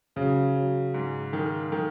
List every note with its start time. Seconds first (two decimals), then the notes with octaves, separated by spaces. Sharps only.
0.16 C#3 F#3
0.55 F#3
0.94 G#2
1.33 D#3
1.72 D#3